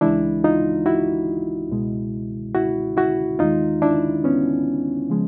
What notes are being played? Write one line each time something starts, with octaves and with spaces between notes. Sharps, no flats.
C#2 C#3 E3 G#3 D4 E4
D#4 F4
E4 F#4
C#2 B2 G#3
E4 F#4
E4 F#4
D#2 D#3 G#3 D#4 F4
D4 E4
B3 C#4
C#3 F3 G#3